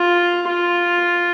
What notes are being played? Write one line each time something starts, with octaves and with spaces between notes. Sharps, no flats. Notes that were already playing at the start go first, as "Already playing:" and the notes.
Already playing: F4
F4